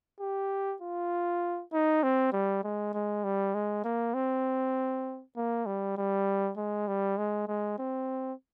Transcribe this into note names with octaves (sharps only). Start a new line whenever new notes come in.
G4
F4
D#4
C4
G3
G#3
G#3
G3
G#3
A#3
C4
A#3
G3
G3
G#3
G3
G#3
G#3
C4